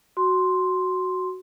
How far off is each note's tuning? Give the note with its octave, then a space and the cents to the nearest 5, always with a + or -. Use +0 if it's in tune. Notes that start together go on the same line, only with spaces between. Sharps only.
F#4 +0 C6 +0